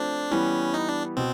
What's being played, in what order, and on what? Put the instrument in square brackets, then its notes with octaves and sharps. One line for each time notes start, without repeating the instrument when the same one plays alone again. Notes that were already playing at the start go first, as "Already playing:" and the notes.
Already playing: [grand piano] F3 A3 C4 F4 [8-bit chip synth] D4
[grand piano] E3 G3 B3 [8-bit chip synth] C#4
[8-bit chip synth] D#4
D4
[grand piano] B2 [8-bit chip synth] C4